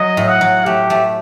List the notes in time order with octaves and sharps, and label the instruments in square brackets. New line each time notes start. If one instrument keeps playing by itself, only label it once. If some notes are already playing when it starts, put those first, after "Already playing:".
Already playing: [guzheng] F#3 [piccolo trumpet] D#5
[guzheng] A2
[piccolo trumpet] F#5
[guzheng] F#3
[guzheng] A3 [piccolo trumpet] G4
[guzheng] A3